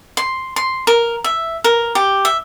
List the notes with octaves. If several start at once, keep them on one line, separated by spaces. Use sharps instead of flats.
C6
C6
A#4
E5
A#4
G4
E5